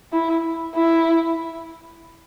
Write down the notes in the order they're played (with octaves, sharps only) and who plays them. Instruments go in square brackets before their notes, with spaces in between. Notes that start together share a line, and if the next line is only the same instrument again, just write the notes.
[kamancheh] E4
E4